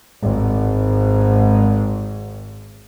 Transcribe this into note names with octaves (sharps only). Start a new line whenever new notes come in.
G#1 G#2